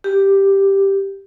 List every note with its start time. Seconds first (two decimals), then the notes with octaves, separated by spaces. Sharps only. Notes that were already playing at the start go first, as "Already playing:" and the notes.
0.04 G4